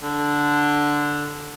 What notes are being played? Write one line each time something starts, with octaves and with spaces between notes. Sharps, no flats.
D3